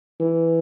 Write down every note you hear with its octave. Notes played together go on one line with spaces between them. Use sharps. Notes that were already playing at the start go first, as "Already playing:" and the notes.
E3